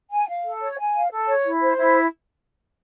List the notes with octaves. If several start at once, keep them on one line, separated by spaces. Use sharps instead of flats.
G#5
F5
A4
C#5
G#5
F5
A4
C#5
E4
C5
E4